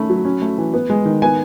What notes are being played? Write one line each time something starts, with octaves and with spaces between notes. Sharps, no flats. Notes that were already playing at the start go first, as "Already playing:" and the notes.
Already playing: D#3 A3 C#4 B5
F#3
C#4
A3
E3
B3
G#3
D#3
B3 G#5